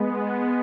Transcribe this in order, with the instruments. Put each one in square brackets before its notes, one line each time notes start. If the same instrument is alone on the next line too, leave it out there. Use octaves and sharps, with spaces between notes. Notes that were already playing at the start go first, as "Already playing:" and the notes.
Already playing: [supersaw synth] G#3 B3